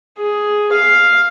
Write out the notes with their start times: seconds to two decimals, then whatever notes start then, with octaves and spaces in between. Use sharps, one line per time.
0.18 G#4
0.72 F5